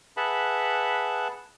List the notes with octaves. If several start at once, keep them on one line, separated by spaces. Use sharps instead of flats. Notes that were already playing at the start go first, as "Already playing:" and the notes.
G#4 B4 E5 F#5 A5 B5